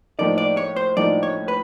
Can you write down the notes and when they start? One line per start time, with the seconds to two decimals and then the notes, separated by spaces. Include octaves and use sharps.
0.19 A2 F3 A#3 D#4 D5
0.38 D5
0.57 C#5
0.76 C5
0.97 A2 F3 A#3 D#4 D5
1.23 C#5
1.48 B4